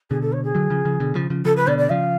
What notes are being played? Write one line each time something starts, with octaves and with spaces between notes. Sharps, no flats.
B2 D3 G#4
A4
C#5
G#4
D3 F#3
C#3 F3
C#3 F3
B2 D3
C#3 F3
C#3 F3
C#3 F3 A4
B4
B2 D3 D5
D5
C#3 F3 F5